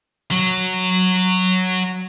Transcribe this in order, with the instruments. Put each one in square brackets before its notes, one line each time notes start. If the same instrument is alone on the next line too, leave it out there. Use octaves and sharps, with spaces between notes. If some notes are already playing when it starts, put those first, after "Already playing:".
[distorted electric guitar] F#3